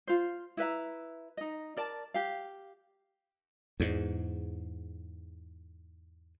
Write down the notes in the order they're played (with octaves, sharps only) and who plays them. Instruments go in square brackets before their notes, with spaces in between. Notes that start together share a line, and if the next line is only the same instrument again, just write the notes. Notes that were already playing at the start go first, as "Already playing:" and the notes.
[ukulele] F4 C5
E4 B4 E5 A#5
D#4 D#5
A#4 D5 A5
G4 F5
[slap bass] E2 G#2